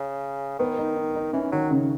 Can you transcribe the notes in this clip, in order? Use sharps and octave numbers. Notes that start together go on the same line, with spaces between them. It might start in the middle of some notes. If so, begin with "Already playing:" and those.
Already playing: C#3
D#3 B3
D#4
D#4
D#4
E3 C#4
D#3 F#3
C#3